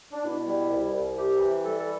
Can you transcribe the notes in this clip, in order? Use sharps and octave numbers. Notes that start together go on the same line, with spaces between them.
D4
B2 E4
G3
C2
C2
C3 G4
E3
G3 A4
A4